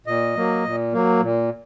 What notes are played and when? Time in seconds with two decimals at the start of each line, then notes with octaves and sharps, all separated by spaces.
0.06 A#2 D#5
0.36 F#3 A#3
0.65 A#2
0.92 F#3 A#3
1.21 A#2